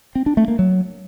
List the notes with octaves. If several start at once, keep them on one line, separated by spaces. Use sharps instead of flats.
C4
D4
A3
A#3
F#3